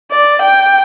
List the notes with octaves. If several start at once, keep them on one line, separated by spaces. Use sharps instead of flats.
D5
G5